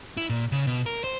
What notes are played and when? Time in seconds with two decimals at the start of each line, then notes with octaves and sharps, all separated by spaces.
0.17 E4
0.29 A#2
0.52 C#3
0.67 B2
0.86 A#4
1.04 C5